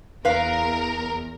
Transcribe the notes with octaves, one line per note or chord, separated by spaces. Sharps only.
E2 A#4 B4 F5